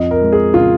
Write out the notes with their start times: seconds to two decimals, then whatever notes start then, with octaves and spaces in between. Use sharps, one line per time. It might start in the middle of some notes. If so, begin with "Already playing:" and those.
Already playing: F2 F3 D#5
0.11 A#4
0.21 G#3
0.32 G#4
0.54 C#3 F4